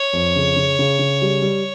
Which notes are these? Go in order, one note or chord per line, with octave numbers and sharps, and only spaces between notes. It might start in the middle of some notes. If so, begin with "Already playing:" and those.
Already playing: C#5
F2
C#3
C#3
C#3
C#3
G3
G3